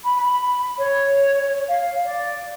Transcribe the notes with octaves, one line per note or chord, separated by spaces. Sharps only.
B5
B5
C#5
F5
D5